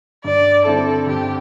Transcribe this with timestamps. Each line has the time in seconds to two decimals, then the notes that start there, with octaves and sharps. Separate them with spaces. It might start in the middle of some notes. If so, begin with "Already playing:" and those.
0.24 G2 D5
0.65 D3 G3 C4 E4 A4
1.07 G2 G4